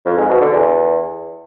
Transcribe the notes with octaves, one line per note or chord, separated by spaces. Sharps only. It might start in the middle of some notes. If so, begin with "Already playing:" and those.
F2
G#2
B2
D3
E2